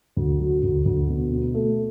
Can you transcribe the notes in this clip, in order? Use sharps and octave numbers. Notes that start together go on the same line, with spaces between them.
D2
F#3
D2
D2
B2
B2
A3